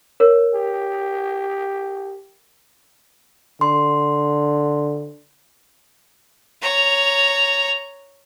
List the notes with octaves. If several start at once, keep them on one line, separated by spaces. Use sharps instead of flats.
A#4 C#5
G4
D3 C6
C#5 A#5